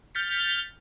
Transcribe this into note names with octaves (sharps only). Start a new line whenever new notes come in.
F6 G6 A6 B6 C#7